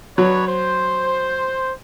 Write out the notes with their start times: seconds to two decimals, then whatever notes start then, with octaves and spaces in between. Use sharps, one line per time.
0.18 F#3 D4 B4 C#5
0.48 C5